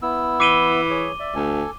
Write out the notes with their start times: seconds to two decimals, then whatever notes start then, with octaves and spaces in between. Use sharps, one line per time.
0.02 B3 E4 E6
0.40 E3 D6 D#7 G7
0.90 G#4 C#5
1.20 D5 E5
1.35 D2 A4 G#5